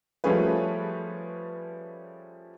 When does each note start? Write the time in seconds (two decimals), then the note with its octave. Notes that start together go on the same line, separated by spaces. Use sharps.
0.24 F3 G3 A3 C#4 G#4 B4